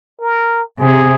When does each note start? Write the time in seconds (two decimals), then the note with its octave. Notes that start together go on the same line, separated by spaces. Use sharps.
0.20 A#4
0.79 C3 G#4